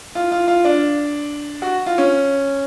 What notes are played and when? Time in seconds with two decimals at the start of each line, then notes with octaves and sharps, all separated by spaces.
0.15 F4
0.32 F4
0.48 F4
0.65 D4
1.62 F#4
1.86 F4
1.98 C#4